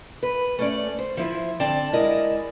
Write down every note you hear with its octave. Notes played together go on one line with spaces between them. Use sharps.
B4
A3 C#4 D5
C5
F3 E4 C5
D3 C4 D5 A5
G#3 E4 A#4 D5 D#5